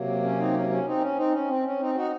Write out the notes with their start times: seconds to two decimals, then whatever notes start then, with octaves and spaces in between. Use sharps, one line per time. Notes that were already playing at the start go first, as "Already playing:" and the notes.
Already playing: C3 F#3 A#3
0.23 C#4
0.38 C4 D#4
0.54 C#4
0.69 C#4
0.86 C4 D#4
1.01 C#4
1.17 C4 D#4
1.33 C#4
1.48 C4
1.65 C#4
1.80 C4 D#4
1.95 D#4 F#4